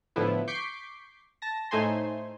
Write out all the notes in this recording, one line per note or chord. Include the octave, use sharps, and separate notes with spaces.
A2 D3 F3 B3 E4
C#6 D6 G6 B6 C7 D7
A5 A#6
A2 A3 D#4 C5 G#5 C6